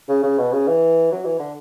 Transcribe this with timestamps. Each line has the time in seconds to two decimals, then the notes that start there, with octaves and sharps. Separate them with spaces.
0.09 C#3
0.23 C#3
0.38 B2
0.53 C#3
0.68 E3
1.12 F#3
1.25 E3
1.40 D3